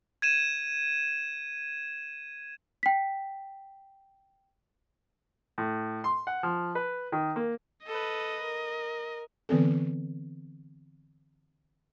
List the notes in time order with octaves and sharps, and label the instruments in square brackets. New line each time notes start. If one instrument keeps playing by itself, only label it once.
[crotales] G#6 D#7 E7
[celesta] G5 B6
[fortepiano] A2
C6
F#5
F3
B4
D#3
A#3
[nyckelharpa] A4 B4 [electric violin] D#5
[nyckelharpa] A#4
[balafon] D3 E3 B3 C4 A4